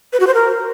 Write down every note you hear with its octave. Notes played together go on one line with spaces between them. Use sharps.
B4
F#4
C5
A#4